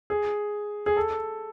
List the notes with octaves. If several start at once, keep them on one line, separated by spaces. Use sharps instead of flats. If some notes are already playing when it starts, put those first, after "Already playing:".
G#4
G#4
A4